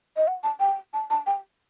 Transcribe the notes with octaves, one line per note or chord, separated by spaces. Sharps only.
D#5
F#5
A5
G5
A5
A5
G5